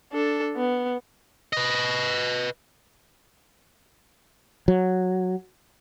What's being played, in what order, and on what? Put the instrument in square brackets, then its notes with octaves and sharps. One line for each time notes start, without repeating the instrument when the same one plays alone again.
[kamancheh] D4 A4
B3
[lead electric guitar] B4 D#5
[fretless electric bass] F#3